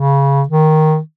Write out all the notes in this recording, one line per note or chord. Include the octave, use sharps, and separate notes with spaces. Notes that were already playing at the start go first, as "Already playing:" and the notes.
Already playing: C#3
D#3